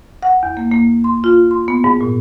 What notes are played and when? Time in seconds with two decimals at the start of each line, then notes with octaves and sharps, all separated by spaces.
0.23 F#5
0.43 E2
0.57 A#3
0.71 A#3
1.04 C6
1.24 F4
1.51 C6
1.68 B3
1.84 G#2
2.01 A#2